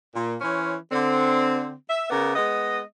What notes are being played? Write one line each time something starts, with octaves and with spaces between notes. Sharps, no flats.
A#2
E3 C#4 C5 C#5
D3 C4
E5
C#3 B3 A#4 D5
G#3 B3 D#5